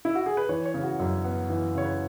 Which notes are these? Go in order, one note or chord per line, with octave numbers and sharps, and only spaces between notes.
E4
F#4
G#4
B4
E3 C#5
C#5
C#3
F#4
F#2
B3
E3
C#3 C#5
B4